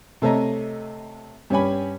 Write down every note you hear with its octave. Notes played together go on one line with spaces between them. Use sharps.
C3 A3 A4 C#5 D#5 A#5
G2 C#4 G4 C#5 G#5 B5